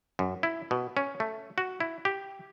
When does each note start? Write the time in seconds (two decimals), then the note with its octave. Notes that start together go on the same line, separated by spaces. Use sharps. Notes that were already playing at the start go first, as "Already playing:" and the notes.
0.19 F#2
0.43 E4
0.71 B2
0.97 C#4
1.20 A3
1.58 F#4
1.80 E4
2.05 G4